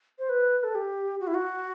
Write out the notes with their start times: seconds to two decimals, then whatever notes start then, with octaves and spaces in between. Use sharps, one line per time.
0.19 C5
0.29 B4
0.64 A4
0.75 G4
1.20 F#4
1.27 E4
1.34 F#4